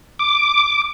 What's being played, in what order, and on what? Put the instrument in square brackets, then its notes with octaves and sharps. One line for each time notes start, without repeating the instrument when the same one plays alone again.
[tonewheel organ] D6